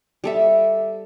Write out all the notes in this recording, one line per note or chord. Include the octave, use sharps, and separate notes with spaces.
G3 A4 E5